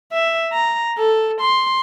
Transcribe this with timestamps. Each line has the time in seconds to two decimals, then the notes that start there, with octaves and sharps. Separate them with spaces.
0.12 E5
0.53 A#5
0.98 A4
1.41 C6